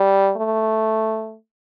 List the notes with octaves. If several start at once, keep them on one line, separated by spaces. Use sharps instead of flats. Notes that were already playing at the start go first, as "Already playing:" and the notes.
Already playing: G3
A3